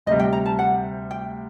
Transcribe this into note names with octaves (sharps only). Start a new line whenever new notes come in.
D2 C3 G3 D#5
G5
A#5
A5
F#5
G5